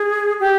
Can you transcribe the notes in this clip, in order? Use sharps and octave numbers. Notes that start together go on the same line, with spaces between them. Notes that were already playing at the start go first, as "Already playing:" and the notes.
Already playing: G#4
G4